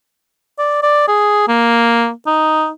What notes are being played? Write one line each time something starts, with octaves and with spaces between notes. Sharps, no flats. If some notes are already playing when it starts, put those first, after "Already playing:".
D5
D5
G#4
A#3
D#4